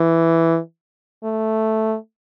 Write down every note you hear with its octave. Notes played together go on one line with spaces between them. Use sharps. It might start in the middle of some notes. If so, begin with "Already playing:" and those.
Already playing: E3
A3